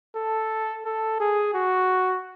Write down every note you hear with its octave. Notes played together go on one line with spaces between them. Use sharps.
A4
A4
G#4
F#4